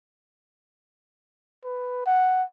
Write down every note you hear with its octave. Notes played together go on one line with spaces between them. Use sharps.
B4
F#5